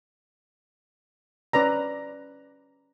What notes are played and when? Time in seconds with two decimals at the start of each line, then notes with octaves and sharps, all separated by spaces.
1.53 C#4 B4 D5 A#5